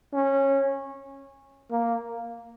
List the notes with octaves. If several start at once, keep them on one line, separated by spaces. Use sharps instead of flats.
C#4
A#3